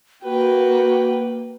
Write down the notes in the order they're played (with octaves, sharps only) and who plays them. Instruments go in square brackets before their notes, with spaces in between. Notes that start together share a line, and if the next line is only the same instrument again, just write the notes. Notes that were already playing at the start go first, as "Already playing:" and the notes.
[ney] A#3 [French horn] F#4 [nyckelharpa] B4 [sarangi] G5